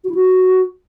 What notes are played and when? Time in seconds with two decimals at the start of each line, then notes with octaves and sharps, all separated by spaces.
0.04 F#4
0.09 E4
0.15 F#4